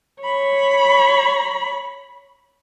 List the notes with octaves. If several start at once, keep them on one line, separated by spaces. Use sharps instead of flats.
C#5 B5